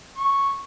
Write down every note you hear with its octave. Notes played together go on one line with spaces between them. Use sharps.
C#6